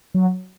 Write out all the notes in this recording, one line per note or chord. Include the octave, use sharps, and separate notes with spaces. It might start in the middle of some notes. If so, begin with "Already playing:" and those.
F#3